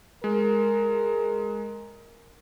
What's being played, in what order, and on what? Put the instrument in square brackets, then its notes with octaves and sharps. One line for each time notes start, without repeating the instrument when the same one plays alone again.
[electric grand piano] G#3 [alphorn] A#4